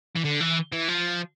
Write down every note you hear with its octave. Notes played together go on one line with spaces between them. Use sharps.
E3
D3
E3
E3
F3